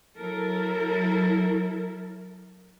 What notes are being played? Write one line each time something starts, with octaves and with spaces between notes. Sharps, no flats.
F#3 E4 A4 A#4